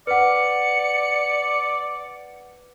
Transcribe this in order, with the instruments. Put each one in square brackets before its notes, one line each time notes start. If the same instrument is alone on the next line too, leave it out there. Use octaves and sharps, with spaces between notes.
[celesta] B4 F#5 [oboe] D5 [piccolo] C#7